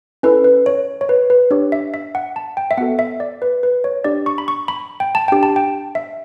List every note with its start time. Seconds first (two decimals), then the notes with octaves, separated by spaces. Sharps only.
0.23 C#4 E4 A4 B4
0.44 B4
0.66 C#5
1.01 C#5
1.09 B4
1.30 B4
1.51 D4 G4 C#5
1.72 E5
1.94 E5
2.15 F#5
2.36 A5
2.57 G5
2.71 E5
2.77 B3 F#4 A4 F#5
2.99 E5
3.20 D5
3.42 B4
3.63 B4
3.84 C#5
4.04 D4 G4 D5
4.26 C#6
4.38 B5
4.48 C#6
4.68 B5
5.00 G5
5.15 A5
5.28 D4 G4 G5
5.43 A5
5.56 G5
5.95 E5